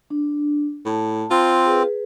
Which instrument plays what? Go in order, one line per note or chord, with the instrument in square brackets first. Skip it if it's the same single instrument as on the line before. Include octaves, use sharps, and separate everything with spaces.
[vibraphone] D4
[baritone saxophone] A2 [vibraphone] A5 B5
[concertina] C4 [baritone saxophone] F4
[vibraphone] G#4 B4